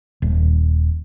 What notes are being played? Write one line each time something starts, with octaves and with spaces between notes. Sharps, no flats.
D#1